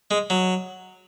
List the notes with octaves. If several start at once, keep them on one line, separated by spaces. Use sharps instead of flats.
G#3
F#3